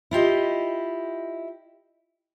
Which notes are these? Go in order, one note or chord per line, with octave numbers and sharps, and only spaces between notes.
E4 F4 G4 D#5